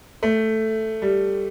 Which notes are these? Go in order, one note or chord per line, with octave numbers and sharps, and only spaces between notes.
A3
G3